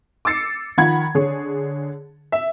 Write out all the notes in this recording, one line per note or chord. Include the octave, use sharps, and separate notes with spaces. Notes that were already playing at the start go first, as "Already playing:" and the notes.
D6 E6 A6 C7 C#7
D#3 F3 F#5 B5 G#6
D3 G#4 C#5
E5